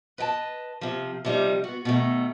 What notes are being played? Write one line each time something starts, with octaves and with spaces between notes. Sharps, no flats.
B4 D#5 G5 A5
C3 F3
C3 F3 G3 D#4
B3 F#4
B2 D#3 A3